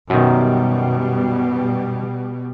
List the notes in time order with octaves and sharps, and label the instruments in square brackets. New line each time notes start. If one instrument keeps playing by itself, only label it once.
[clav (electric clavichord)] F#2 D#3 [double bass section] B2 G3